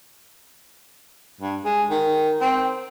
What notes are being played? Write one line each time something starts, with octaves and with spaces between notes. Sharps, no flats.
G2
G#3
D#3
C4